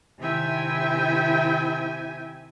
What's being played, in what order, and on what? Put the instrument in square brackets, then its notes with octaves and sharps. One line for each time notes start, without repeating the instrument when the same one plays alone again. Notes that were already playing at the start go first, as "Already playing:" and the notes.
[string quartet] C3 D#3 E4 E5 G5 G#5